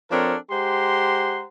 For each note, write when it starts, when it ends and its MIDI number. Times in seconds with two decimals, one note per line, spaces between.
0.11 0.36 53
0.11 0.36 60
0.11 0.36 62
0.11 0.36 69
0.11 0.36 70
0.11 0.36 73
0.51 1.45 56
0.51 1.45 67
0.51 1.45 72
0.51 1.45 78
0.51 1.45 82
0.51 1.45 84